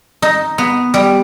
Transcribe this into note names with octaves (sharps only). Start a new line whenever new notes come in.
D#4
B3
G3